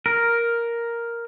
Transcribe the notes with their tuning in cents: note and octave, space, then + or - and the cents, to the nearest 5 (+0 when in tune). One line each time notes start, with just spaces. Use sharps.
A#4 +5